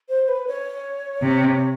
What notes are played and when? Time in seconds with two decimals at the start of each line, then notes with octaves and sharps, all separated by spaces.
0.09 C5
0.28 B4
0.47 C#5
1.22 C3